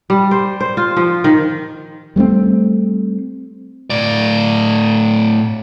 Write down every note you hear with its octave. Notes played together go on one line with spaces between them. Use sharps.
G3
C5
C5
F4
F3
D#3
G3 A3 B3 C4
A2 D5